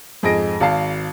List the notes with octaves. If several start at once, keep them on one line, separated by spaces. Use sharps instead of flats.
F2 G#2 G#4 D#5 A#6 D7
G#1 F5 A5 C7